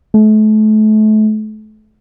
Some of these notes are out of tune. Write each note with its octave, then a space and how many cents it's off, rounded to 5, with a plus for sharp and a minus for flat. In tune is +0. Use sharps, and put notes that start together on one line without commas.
A3 -35